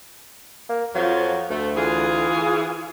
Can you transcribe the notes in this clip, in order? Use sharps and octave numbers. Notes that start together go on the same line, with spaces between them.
A#3
F2 F3 F#3
D2 A3
E3 F4 G#4